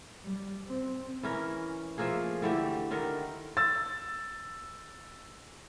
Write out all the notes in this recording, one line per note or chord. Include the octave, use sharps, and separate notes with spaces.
G3
C4
E3 C#4 A#4
F3 A3 A#3 G#4
D3 E3 A3 G4
D3 D#3 A#4
E6 A6